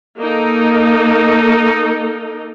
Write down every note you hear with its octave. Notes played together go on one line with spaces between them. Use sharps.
A#3 D#4 A4